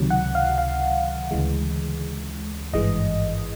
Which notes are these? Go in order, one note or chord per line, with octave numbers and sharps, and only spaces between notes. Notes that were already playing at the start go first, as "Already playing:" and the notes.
Already playing: C#2 C3 D#3 F#3
F#5
F5
F5
D2 C#3 E3 G#3
G#1 G2 E3 G#3 D#5